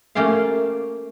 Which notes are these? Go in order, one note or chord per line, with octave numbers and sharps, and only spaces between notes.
A3 A#3 C#4 G4 F5